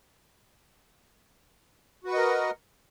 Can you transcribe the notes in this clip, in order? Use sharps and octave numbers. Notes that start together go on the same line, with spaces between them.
F#4 A#4 B4 D#5 F#5